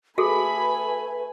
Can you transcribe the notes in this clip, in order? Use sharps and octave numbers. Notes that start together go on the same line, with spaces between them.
A3 F#4 G#4 A4 B4 G#5 B5